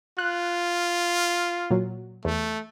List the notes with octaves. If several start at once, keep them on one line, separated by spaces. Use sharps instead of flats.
F4 F#6
A#2 F#3
E2 A3